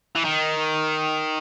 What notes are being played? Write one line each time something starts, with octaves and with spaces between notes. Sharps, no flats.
E3
D#3